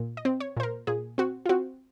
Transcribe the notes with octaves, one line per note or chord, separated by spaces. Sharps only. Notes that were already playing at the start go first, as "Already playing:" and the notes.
Already playing: A#2
D#5
C4
C#5
A#2 C5
A#4
A#2 G#4
C4 F#4
F4
C4 F#4